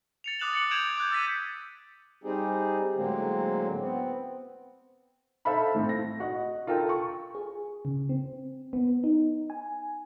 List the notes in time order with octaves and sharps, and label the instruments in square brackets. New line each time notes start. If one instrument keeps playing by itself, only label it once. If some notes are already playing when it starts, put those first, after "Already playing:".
[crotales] A6 C#7 F7
D6 D#6 F#6 E7 F#7
A6 C#7 F#7
D#6 G6 G#6 D7 E7 F7
D6 F#6 G6
E6 A6 B6 D#7
[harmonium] G3 C4 D#4 G4 G#4
A2 D3 F#3 G#3 A#3 C4
B3 C4
[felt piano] A4 C5 E5 F5 B5
A2 A3 C4
A#6
F#4 D#5
F4 A4 A#4 G5
C#6
[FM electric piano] G#4
C#3
C4
B3
D#4
G#5